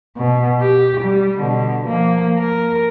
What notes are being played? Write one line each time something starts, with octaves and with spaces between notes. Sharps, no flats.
B2
G4
G3
B2 D3
F3 A#3
A#4